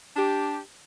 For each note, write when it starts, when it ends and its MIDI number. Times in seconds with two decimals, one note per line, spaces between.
0.17 0.59 62
0.17 0.59 67